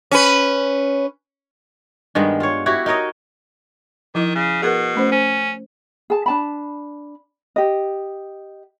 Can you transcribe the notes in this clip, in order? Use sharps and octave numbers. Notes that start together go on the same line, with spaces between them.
C#4 B4
G2 D#3 G#3 B3
F4 C#5
E4 F#4 G4 C#5
D#4 A#4 C#5 D#5
D#3 F3 E4 D#5
C#3
B2 G#4 A#4 F#5
A3 C#4 C5
C#4 C5
G#4 A5
D4 A5 B5
G4 D#5